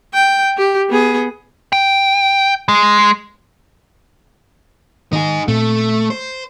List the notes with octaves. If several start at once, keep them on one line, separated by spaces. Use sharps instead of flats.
G5
G4
B3 G#4
G5
G#3
D#3 D#4 G#4
A#2 A3 C4
C5